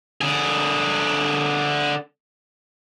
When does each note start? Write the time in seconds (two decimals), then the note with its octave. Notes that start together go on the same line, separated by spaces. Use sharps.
0.21 D3 G#4